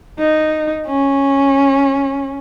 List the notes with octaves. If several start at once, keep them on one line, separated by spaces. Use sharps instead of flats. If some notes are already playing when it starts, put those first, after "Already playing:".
D#4
C#4